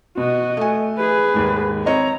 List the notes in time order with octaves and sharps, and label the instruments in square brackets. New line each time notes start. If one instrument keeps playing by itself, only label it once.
[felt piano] B2 [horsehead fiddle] F#4 D#5
[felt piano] A3 G#5
[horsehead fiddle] G#4 B4
[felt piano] D#2 G#2
[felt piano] C4 C#5 D#5 [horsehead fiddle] A#5